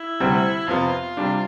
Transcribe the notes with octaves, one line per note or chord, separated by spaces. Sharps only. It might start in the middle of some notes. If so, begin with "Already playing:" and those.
Already playing: E4
D2 C3 G3 C4
F2 C3 F3 B3 F4
C3 G3 D4